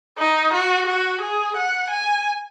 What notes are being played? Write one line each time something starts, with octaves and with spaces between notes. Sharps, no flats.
D#4
F#4
F#4
G#4
F#5
G#5